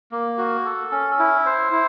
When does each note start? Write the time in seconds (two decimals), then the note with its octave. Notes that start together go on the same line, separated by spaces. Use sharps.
0.11 A#3
0.38 F#4
0.65 A4
0.92 C#4
1.19 E4
1.46 C5
1.72 E4